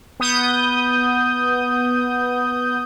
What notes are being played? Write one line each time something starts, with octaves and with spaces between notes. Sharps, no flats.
B3 D#6 G6